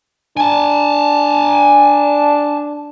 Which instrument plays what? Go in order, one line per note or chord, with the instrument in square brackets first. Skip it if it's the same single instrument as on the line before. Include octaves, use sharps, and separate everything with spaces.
[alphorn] D4 [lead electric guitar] G#5 A5